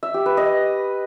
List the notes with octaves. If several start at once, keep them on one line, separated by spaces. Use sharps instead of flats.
E5
G4
B4
D#5